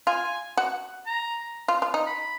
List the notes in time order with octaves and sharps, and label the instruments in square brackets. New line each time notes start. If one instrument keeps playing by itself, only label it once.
[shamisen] F4 [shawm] G#5
[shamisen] F#4
[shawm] A#5
[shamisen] F4
F4
D#4
[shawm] B5